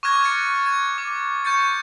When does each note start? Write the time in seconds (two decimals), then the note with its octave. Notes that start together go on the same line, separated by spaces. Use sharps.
0.03 C#6 D6 F6 F#6 G#6 A#6
0.24 F#6 A6 C#7
0.66 G#6
0.98 D6
1.45 C#6 G6 A6 C#7